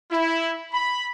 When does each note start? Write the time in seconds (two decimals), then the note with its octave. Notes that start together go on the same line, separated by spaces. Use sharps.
0.12 E4
0.74 B5